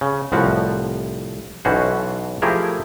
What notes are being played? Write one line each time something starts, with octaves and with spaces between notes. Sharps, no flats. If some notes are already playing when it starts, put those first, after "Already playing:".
C#3
C2 A2 F3 F#4
B1 B2 E3 C#4 F#4 C5
F3 A3 E4 G4 G#4 A#4